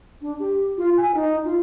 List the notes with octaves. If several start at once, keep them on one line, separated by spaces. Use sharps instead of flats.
D4
G4
F4
G#5
D#4
F4